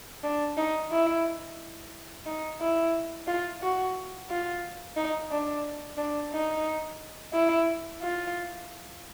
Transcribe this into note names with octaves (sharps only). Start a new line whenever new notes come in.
D4
D#4
E4
D#4
E4
F4
F#4
F4
D#4
D4
D4
D#4
E4
F4